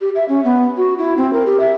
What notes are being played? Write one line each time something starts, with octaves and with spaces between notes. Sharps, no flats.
G4
E5
C#4
B3
F#4
E4
C4
A#4
G4
E5